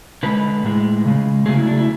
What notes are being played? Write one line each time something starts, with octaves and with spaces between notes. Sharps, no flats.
D3 G#3 B4
A2 G#3
C#3 G#3
C#3 F#3 A3 G#4
E4
D4
E4